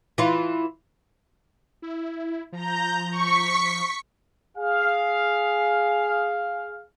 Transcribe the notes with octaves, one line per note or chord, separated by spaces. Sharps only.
E3 F4
E4
F3 A#5 G6
C#6 B6 C#7
G#4 F5